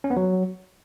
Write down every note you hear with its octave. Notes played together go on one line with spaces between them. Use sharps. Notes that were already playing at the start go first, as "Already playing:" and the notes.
C#4
B3
F#3